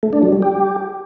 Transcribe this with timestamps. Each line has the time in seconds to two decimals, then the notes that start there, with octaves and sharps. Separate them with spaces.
0.03 A3
0.13 D4
0.23 F#3
0.32 G3
0.42 G4